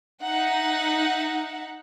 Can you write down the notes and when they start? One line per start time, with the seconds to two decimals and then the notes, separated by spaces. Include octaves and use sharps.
0.22 D#4 E5 F#5